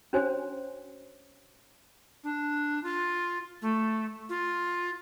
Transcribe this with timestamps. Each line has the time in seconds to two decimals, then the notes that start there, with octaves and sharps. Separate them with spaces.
0.13 C#4 D4 F#4 C5 C#5 G#5
2.24 D4
2.83 F4
3.62 A3
4.29 F4